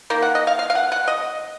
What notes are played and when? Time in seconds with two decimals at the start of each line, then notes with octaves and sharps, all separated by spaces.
0.10 D#3 A#3
0.22 F#5
0.35 D#5
0.47 F5
0.59 F5
0.70 F5
0.75 F#5
0.92 F#5
1.08 D#5